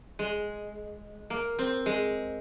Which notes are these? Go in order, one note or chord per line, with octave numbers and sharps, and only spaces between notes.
G#3
A#3
C4
G#3